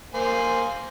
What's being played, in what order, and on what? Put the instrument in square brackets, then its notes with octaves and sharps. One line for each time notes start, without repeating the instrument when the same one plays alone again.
[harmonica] A#3 C5 G#5